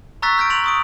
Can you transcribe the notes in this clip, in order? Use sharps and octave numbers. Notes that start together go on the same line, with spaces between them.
A#5 C#6 E6 F#6 A6 B6
F6 G6 A6 D7
A#5 C6 D7 F7 F#7
C#6 D#6 D7